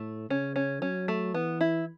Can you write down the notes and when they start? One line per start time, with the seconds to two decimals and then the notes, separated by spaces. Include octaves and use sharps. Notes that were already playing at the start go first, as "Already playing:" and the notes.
Already playing: A2 A3
0.29 C#3 C#4
0.56 C#4
0.82 F#3 C#4
1.08 A3
1.34 E3 B3
1.61 E4